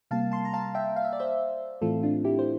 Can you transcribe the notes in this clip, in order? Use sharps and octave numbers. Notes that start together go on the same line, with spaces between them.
C3 G3 A#3 F5 A5
A5 C6
A#5
F5 A5
E5 G5
F5
E5
D5
C5 E5
A2 E3 A3 C4 F4 A4
D4 F4
E4 G4
C5